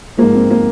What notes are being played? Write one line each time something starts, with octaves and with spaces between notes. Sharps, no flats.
G#2 F3 G#3 A#3
C4
A#3